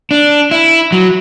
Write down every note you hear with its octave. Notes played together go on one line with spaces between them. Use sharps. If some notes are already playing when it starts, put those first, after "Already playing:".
D4
E4
F#3